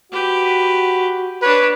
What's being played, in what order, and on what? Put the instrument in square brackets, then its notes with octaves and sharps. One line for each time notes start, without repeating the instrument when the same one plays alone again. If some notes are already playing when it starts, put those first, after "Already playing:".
[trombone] F#4 [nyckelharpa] G4 B4
[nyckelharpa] D4 C#5 [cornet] B4